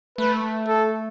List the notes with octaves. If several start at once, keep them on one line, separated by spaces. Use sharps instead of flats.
A3 B4
A4